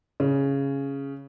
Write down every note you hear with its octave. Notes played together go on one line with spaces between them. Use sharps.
C#3